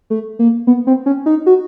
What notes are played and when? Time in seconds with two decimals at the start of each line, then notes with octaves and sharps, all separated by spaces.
0.10 A3
0.39 A#3
0.67 B3
0.87 C4
1.06 C#4
1.26 D#4
1.46 F#4